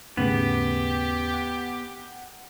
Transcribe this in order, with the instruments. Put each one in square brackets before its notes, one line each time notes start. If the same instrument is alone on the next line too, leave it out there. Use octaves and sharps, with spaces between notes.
[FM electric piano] D#2 C#3 [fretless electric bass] G#2 A3 C#4 [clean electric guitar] B3 [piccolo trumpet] G4
[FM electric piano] F#5